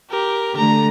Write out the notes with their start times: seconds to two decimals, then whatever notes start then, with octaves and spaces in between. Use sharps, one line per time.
0.11 G4 A#4
0.57 D3 A3 A#5